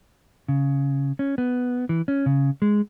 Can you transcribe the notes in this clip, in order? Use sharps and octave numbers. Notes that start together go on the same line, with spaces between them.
C#3
C#4
B3
E3
C#4
C#3
G#3